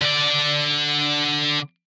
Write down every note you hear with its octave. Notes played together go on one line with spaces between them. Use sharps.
D3 D5